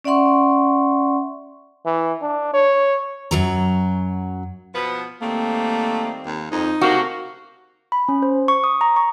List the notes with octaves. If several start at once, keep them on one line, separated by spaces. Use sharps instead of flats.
C#4 D5 E5 F#5 C6 C#6
E3
D4
C#5
F#2 F#3 A#5
B2 F3 B3
D#3 G3 A3 A#3 C4
D#2
F2 D#4
C3 A3 A#3 F#4
B5
C#4
C5
C#6
D#6
A#5
C#6